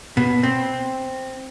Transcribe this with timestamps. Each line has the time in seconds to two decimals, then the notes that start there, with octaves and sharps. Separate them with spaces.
0.17 B2
0.43 C4